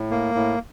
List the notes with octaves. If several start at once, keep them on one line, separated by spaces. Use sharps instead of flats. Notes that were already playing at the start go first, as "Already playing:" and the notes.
Already playing: A2
A#3
A2